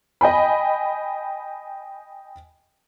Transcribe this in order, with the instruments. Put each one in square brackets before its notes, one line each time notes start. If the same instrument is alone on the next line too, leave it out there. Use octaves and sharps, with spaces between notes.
[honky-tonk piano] D#5 G5 G#5 B5